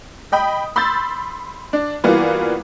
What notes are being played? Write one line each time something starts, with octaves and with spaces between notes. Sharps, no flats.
D#5 G5 B5 D#6
B5 C6 E6 G6 A6
D4
E3 G3 A#3 B3 F4 F#4